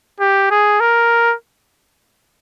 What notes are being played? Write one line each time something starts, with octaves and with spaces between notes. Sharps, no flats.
G4
G#4
A#4